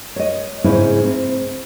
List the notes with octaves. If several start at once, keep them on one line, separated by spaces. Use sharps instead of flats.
C#5 D#5
G#2 C#3 C4 D#4 E4
C4